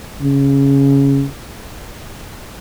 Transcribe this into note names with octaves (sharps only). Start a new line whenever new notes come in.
C#3